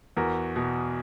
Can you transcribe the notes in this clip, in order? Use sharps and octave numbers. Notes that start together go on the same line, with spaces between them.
E2 F#4 A#4
B2